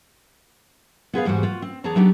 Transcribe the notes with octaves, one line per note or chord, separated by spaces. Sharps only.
B3 G#4 B4 F5
E2 G#2 G3 F#4 C5
F4 F#4
C4
E2 B3 G#4 C#5 A5 A#5
F#3 B3 D4 D#4 G4